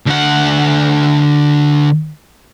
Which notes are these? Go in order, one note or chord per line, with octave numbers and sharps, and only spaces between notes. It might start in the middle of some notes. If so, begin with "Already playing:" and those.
D2 F#5